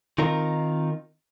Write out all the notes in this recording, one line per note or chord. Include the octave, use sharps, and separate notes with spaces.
D#3 C4 D#4 F4 A#4